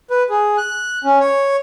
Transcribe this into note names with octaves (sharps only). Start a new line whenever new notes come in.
B4
G#4
F#6
C#4
C#5